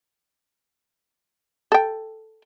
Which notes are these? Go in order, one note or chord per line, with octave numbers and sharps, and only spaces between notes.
A4 G5